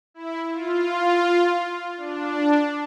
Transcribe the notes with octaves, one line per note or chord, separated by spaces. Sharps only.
E4
F4
D4